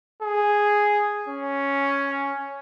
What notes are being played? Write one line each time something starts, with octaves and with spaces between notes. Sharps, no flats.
G#4
C#4